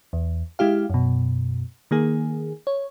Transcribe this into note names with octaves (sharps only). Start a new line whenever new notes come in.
E2
G#3 E4 G4 F5
F#2 B2
D#3 A#3 G#4
C#5